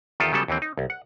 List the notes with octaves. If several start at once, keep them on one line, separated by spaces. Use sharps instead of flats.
E2 D#3 F4 G4 A4
C#3 F#3 G3 B3 A4
D#2 E3 C4
D#4
C2
F#5